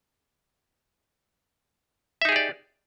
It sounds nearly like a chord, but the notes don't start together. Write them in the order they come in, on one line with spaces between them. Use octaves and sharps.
E5 D#4 G#4 G4 D5